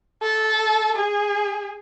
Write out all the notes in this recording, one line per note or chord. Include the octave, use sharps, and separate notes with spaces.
A4
G#4